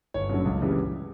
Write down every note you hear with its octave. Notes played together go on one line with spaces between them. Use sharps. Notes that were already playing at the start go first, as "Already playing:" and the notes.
G1 C#5
F#2 D3 F#3
C#2
C#3 E3 G3